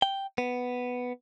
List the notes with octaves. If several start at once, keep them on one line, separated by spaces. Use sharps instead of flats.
G5
B3